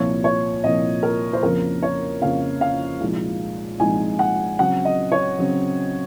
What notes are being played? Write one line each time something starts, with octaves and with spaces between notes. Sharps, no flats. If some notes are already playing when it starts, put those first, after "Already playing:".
Already playing: C2 A#2 F3 A#3 C#5
C#5
C2 A#2 F3 A#3 D#5
A#4
C5
F2 C#3 F3 A#3 A#4
C#5
F2 C#3 F3 A#3 F5
F5
C2 A#2 F3 G#3 D#4
C2 A#2 F3 G#3 D#4 G#5
F#5
C#3 F#3 C4 F#5
D#5
C#5
C#3 F#3 C4